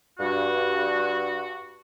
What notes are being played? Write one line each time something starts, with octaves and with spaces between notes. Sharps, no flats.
G2 F#4